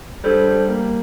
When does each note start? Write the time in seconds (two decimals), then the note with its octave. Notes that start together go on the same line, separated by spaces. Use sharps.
0.24 G3 D4 A4 C5
0.47 G3
0.68 A#3